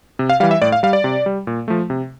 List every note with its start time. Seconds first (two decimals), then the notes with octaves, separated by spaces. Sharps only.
0.19 C3
0.29 F5
0.40 E3 G3 F5
0.51 E5
0.62 A2 D5
0.72 F5
0.83 G3 F5
0.93 D5
1.04 C3
1.26 G3
1.47 A#2
1.68 F3 A3
1.90 C3